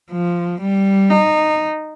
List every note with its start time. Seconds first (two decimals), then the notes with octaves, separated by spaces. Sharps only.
0.11 F3
0.61 G3
1.10 D#4